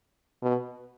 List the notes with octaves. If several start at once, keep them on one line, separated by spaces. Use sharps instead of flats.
B2